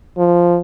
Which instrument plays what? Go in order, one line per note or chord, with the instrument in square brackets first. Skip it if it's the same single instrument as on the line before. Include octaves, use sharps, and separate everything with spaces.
[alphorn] F3